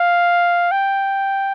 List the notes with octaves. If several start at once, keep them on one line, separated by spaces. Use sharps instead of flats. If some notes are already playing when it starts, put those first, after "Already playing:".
Already playing: F5
G5